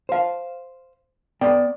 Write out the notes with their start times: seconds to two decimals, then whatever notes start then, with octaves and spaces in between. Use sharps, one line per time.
0.09 C5 F5
1.41 B3 D5 G5